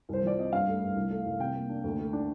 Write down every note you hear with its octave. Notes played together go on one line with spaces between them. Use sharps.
C2 C5
F3 D5
C4 D#5
G2 F5
A3
G2
C2
A3
C2
C3 G5
A#3
D4
D2
A3
D4